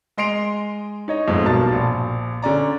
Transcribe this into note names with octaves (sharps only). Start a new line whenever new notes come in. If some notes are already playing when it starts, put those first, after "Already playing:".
G#3 D#5 C6 C7 D7 F7
D#4 C#5 D#5
F2 G#2 A3
B1 G2 B2 A#3 A5 A6
A#1
D3 C#4 D5 A#5